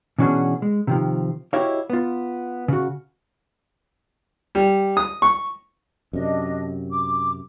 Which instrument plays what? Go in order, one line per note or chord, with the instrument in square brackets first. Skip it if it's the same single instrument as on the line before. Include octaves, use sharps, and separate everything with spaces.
[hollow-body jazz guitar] B2 E3 C#4 D4 F#4 G#4
G#3
C3 D#3 F3
E4 F#4 G4 C#5 D#5 F5
B3 F4
C#3 F#4
[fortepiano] G3
D#6
C#6
[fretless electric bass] F#2 C3 [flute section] D4 D#5
[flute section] D6